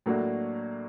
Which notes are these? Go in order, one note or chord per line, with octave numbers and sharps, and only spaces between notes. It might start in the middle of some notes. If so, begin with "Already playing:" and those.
A2 F#3 A#3 D4 F#4